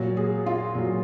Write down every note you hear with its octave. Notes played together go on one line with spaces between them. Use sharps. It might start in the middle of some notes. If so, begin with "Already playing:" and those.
Already playing: A#2 F#3
G#4
F4
A#2 F#3